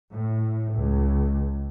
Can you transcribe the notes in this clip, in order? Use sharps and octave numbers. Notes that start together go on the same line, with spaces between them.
A2
C#2